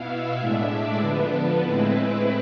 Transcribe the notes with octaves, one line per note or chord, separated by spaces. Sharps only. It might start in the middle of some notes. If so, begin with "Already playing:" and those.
Already playing: B2 B3 E4 F5
E5
A2 G#3 D4
D5
D3 F3 B3 D4 B4
A2 G#3 C4 E4
B4